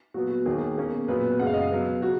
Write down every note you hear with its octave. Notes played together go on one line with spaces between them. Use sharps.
A#2 F#3 B3 F#4
F#4
D#2 D#3 A#3 G#4
B2 A#3 C#4
A#2 F#3 B3 B4
F#2 C#3 G#3 F#5
F5
D#5
F5
B2 F#3 B3
C#3 F#4